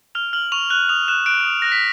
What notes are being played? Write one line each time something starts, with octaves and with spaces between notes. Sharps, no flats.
F6 F7
F6 F#7
C#6 F7
F#6 F7
D#6 F7
F#6 E7
F#6 D7
D#6
F#6 A#6
B6